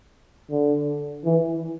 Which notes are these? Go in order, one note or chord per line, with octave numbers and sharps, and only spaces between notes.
D3
E3